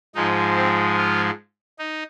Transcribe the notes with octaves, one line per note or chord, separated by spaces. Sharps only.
G#2 F3 G#3 D#4
C4
F4
D#4